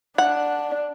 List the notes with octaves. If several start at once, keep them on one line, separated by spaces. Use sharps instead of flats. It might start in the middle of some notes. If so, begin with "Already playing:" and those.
D4 F#5